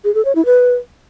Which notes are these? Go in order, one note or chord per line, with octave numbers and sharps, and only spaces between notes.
G#4
A4
C#5
E4
B4